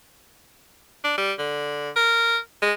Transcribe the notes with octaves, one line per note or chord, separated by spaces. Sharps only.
D4
G3
D3
A#4
G#3